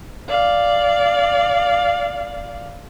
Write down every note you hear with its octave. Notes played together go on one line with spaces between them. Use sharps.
D5 F5